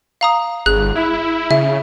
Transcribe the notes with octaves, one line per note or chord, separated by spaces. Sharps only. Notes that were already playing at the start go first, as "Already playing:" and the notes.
F5 A#5 D#6
G1 G#4 F#6
E4
C#3 E5